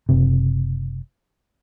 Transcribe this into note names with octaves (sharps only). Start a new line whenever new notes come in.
F#1 C3